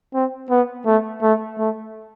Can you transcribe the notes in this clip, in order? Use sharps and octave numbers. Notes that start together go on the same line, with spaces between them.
C4
B3
A3
A3
A3